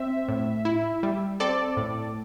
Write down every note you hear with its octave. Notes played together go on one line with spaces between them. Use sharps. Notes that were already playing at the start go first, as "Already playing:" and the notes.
Already playing: C4 E5
A2
E4
G3
C4 A4 D5
A2